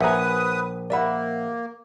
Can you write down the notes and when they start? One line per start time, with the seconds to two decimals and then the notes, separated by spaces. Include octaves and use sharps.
0.01 A#1 B4 E5 F#5 G#5 A#5 D#6
0.90 A#3 A#4 D5 E5 F#5 B5